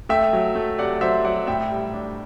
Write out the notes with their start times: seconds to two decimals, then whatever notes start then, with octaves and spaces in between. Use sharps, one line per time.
0.09 A3 E5 G5
0.33 F#3
0.55 A3
0.78 C3 D5 F#5
1.01 F#3 C5 E5
1.24 F#3 D5 F#5
1.47 A2 E5 G5
1.71 G3
1.94 D4